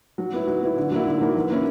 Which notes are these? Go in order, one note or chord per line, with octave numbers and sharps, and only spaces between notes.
F#3
B3 E4
F#3
B3 E4
D3
F#3 A#3 E4
D3
F#3 A#3 E4
E3
A#3 C#4 E4